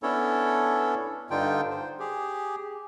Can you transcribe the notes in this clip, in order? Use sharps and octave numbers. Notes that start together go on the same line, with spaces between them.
B3 C#4 D4 E4 A4 C#5
G2 D3 D4 D#4 F4 G5
C5
G4 G#4